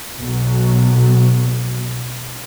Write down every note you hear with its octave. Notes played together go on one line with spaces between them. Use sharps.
B1 B2